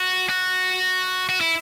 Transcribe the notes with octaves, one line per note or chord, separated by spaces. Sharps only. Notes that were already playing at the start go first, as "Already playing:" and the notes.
Already playing: F#4
F#4
F#4
E4